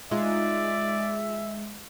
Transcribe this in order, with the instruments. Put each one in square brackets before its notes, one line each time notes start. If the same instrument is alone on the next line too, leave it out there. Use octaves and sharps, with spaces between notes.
[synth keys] G#3 [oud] D#4 F4 [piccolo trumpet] D5 [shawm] E5